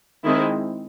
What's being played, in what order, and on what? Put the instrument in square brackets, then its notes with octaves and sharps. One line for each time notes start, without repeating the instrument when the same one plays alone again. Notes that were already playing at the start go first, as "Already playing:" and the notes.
[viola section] D#3 G#3 C4 E4